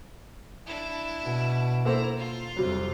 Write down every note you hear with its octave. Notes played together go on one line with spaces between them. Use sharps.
D4 E4
B2
A#3 E4 A4 C5 A#5
F4
F2 C3 F#3 G3